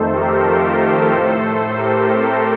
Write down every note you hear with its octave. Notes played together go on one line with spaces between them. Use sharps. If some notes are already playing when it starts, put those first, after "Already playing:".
Already playing: F2 D#3 A3 A4 C5
G4 A#4
F4 A4
G4 A#4
A2 A3 A4 C5
G4 A#4
C4